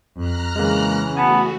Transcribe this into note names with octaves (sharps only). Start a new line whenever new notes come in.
F2 A#5 F6 F#6
C#3 E3 G#3 A#3
A3 B3 F#4 G#5 A5